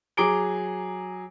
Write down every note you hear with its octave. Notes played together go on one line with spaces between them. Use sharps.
F#3 G#4 A#5 D6 D7 G7